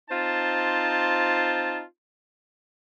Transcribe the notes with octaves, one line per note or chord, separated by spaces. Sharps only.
C4 D#4 F4 C5 A5